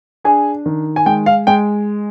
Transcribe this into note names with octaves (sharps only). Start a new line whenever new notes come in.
D4 G#4 G#5
D#3
G#5
G#3 G5
F5
G#3 G5